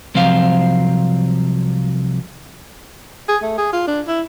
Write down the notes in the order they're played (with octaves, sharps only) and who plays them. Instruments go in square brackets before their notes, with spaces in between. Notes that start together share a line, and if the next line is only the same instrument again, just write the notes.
[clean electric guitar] C2 F3 F#3 C4 C5 F5
[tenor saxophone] G#4
A3
G#4
F4
D4
E4